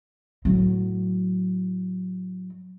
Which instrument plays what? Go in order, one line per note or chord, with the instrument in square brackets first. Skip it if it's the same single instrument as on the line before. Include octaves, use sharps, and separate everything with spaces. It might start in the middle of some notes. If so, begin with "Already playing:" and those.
[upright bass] A2 F#3